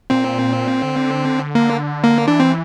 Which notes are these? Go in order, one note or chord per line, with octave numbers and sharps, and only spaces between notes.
A#2 C4
D3
A#3
A#3
E3 D4
C4